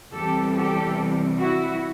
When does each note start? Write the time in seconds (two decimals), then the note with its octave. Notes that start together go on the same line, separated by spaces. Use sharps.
0.14 E2 C3 E3 G3 G4 A4
0.55 G4 A4
1.38 E4 F#4